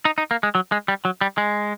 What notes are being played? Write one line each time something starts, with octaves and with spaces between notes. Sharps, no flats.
D#4
D#4
A#3
G#3
F#3
G#3
G3
F#3
G3
G#3